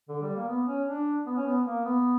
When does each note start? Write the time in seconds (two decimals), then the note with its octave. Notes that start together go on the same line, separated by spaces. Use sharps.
0.09 D3
0.22 G3
0.35 A#3
0.48 B3
0.67 C#4
0.87 D4
1.26 B3
1.37 C#4
1.46 B3
1.66 A#3
1.85 B3